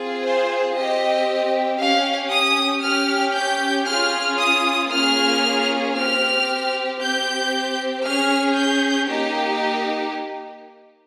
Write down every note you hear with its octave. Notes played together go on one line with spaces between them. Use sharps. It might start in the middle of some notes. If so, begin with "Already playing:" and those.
Already playing: C4 F4 G#4
C5
C4 G4 D#5
C#4 G4 F5
D#6
C#4 G4 F6
G6
C#4 F4 G#4 F6
D#6
A#3 C#4 F4 G#4 F6
C4 G4 F6
C4 G4 G6
C#4 G#4 F6
G6
A#3 D#4 G4